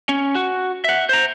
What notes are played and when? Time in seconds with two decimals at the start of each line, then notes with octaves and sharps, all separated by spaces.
0.09 C#4
0.35 F#4
0.84 E5 F#5
1.09 C5 A#5